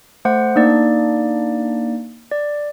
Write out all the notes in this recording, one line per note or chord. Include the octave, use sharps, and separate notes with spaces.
A3 C5 F#5
A#3 D4 D#4 D5
D5